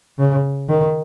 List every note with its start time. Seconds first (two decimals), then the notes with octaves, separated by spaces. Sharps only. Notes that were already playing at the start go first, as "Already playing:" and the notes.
0.19 C#3
0.68 D#3